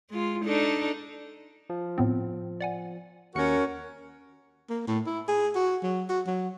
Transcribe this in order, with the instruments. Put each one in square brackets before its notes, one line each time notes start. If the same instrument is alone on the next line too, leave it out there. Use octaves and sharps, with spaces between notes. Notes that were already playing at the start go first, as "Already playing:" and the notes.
[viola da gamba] G#3 F4
D4 D#4 A4
[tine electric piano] F3
[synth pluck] A2 B3 C4
D5 F#5 G#5
[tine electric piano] D#2 C#7 [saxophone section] C#4 F#4 A#4
[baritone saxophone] A#3
A2
E4
G#4
F#4
F#3
F#4
F#3